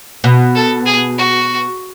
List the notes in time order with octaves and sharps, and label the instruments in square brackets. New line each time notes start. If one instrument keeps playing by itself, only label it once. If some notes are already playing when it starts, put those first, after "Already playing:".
[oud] B2
[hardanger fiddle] A4
G#4
F#4